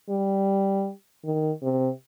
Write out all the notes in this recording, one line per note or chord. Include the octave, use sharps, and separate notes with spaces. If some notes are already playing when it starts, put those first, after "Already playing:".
G3
D#3
C3